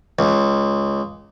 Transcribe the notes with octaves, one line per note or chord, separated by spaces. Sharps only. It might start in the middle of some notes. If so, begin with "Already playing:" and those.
C#2